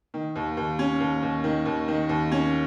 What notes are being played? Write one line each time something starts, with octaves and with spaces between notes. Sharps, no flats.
D#3
D#2
D#2
C#4
D#2
D#2
D#3
D#2
D#3
D#2
C#4